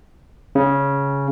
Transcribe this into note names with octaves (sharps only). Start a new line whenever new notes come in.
C#3